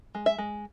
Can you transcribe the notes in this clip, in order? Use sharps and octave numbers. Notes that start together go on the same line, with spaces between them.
G#3
E5
G#3